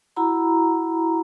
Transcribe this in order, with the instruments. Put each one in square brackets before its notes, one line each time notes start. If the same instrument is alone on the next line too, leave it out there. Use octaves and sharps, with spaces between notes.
[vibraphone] E4 F#4 F#5 A#5 B5